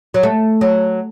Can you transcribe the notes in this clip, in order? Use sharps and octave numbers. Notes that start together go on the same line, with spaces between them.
F#3
A3
F#3